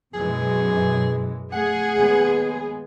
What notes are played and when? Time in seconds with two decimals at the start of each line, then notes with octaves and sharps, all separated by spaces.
0.14 F#2 B2 E3 G#3 G#4
1.52 A3 G#4 F#5
1.93 D#2 G#3 B3